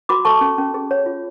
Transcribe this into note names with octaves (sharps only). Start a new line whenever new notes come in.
F#4 B5 D6
A4 A5 C#6
C#4
C#4
G#4
C#5
F4